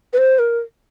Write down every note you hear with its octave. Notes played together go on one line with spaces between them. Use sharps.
B4
C5
A#4